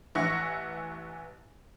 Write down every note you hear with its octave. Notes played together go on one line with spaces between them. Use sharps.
A1 E3 E5 F#5 C#6 A#6